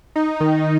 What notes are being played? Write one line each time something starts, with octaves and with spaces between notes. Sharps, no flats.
D#4
D#3